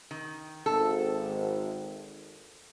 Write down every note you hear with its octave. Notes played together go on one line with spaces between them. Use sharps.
D#3
G#1 A4